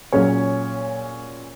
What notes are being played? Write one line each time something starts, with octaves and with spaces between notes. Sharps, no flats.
A#2 F#3 C#4 G#4 C#5